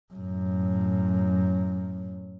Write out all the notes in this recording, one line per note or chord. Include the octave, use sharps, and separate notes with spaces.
F#2 A2